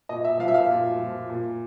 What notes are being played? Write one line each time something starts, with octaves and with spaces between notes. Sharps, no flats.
A#2 D#5
E5
F3 F5
E5
F5
A#2
F3
A#2